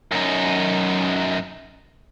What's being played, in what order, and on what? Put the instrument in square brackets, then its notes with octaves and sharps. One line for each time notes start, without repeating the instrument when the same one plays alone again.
[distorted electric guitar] F#2 D#4